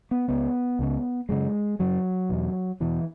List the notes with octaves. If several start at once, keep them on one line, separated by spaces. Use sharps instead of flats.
B3
C#2 C#3 B3
C#2 C#3
F#2 C#3 G#3
F#2 C#3 F#3
E2 B2
E2 B2 E3